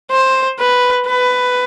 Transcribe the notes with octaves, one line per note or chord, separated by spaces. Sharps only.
C5
B4
B4